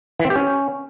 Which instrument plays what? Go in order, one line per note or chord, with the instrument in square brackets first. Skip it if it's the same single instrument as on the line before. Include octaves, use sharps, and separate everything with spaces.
[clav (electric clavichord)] E3
C4
G4
C#4